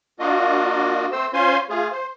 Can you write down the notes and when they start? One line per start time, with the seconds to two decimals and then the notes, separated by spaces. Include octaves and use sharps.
0.19 A#3 D4 F4 F#4 D#5
1.12 A3 C4 C5 E6
1.33 C#4 F4 C5 G#5 C6
1.69 A3 F4 G#4
1.92 C5